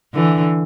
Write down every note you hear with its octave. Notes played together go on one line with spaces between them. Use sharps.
D3 E3